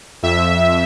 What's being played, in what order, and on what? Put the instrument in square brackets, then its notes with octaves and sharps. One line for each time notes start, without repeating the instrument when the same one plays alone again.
[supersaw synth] F2 E5